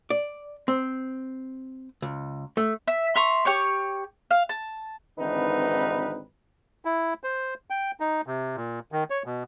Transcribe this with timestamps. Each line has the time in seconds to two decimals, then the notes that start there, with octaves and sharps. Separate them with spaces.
0.10 D5
0.68 C4
2.02 C#2
2.57 A3
2.88 E5
3.15 E5 A#5 C6 C#6
3.45 G4 C#5 C#6
4.31 F5
4.49 A5
5.18 G#1 D3 E3 C4 D#4 B4
6.85 E4
7.24 C5
7.70 G5
8.00 D#4
8.27 C3
8.56 A#2
8.92 D#3
9.10 C#5
9.26 B2